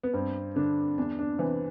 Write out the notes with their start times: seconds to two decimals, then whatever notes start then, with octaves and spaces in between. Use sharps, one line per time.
0.03 B3
0.14 G2 C4
0.56 D3 D4
0.98 E2 D4
1.19 D4
1.39 C3 E3 C4